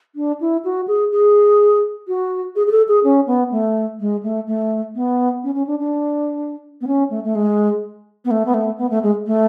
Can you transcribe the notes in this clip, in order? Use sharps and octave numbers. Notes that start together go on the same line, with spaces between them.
D4
E4
F#4
G#4
G#4
F#4
G#4
G#4
A4
G#4
C#4
B3
A3
G#3
A3
A3
B3
C#4
C#4
D4
D4
B3
C#4
A3
A3
G#3
B3
A3
B3
A3
B3
A3
G#3
A3